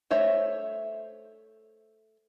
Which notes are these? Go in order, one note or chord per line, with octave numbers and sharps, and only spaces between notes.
A3 C5 C#5 E5